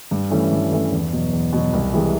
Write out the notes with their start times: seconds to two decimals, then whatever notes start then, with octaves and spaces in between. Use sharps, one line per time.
0.11 G2
0.31 E3 A3 C#4
0.52 G2
0.72 E3 A3 C#4
0.92 E2
1.12 B2 F#3
1.33 E2
1.53 B2 F#3
1.73 C2
1.93 C3 E3 G#3